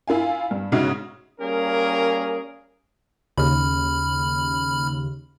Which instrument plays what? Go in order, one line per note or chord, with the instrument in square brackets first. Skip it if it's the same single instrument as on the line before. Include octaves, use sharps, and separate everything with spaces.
[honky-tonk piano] E4 F4 F5 G#5
G2
G#2 C#3 D#4 F#4 E5
[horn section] G3 A#3 C#4 G#4 A#4
[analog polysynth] D#2 C#3 [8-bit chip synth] B5 F6